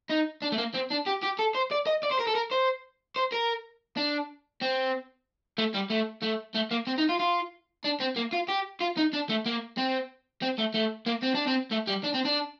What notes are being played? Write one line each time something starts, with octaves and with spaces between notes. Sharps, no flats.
D#4
D4
A3
A#3
C4
D4
G4
G4
A4
C5
D5
D#5
D5
C5
A#4
A4
A#4
C5
C5
A#4
D4
C4
A3
G3
A3
A3
A3
A#3
C4
D#4
F4
F4
D4
C4
A#3
F4
G4
F4
D#4
D4
A3
A#3
C4
C4
A3
A3
A#3
C4
D4
C4
A3
G3
D4
C4
D4